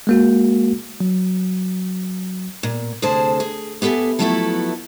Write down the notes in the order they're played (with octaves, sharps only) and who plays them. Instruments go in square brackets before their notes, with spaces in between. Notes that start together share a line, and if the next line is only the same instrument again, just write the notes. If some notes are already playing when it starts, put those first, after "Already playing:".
[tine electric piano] G#3 A#3 F#4
F#3
[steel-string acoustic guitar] A#2
D2 C3 G#4 A4 C5 A5
G#4
B3 G4 A4 E5 G#5
F3 F#3 A3 B3 E4 A4